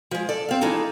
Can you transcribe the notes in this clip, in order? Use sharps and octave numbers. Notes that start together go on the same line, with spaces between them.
F3 G#3
A4 D5
C4 F5
E3 F3 G#3 D#4 A4